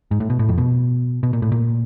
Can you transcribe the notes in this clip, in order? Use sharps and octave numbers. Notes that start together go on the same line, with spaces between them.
G#2
A2
B2
A2
F2
B2
B2
A#2
A2
A#2